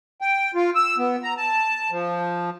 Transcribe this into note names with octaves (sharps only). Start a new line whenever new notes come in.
G5
F4
E6
B3
A#5
A5
F3